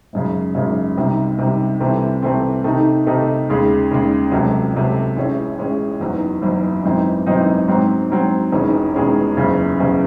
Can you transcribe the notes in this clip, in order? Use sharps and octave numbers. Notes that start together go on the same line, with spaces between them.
G#1 F#2 C#3
G#1 F#2 C#3
C2 C3 D#3
C2 C3 D#3
C2 C3 E3 A3 C4
C2 C3 E3 A3 C4
C3 D#3 A3 D#4
C3 D#3 A3 D#4
D#2 C#3 G#3
D#2 C#3 G#3
C#2 C3 F#3 A3
C#2 C3 F#3 A3
A1 A2 G#3 C#4
A1 A2 G#3 C#4
F#1 E2 D#3 F#3
F#1 E2 D#3 F#3
G#1 F#2 E3 C4 D#4
G#1 F#2 E3 C4 D#4
G#2 F#3 C4
G#2 F#3 C4
E1 E2 D#3 G#3 C#4
E1 E2 D#3 G#3 C#4
F#1 E2 C#3
F#1 E2 C#3